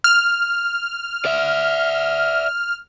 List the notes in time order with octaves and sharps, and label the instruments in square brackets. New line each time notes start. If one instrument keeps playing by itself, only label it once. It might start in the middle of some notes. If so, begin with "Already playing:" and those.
[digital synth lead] F6
[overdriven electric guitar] D5 E5